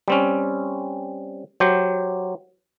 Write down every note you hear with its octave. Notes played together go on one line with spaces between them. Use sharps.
G3 C4 C#4
F#3 G4 C5